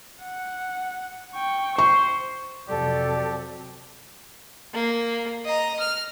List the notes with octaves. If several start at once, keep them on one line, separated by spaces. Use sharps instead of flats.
F#5
G5 C#6
C5 C#6
F2 C3 F#3 G4 A4 D5
A#3
D#5 A#5
F6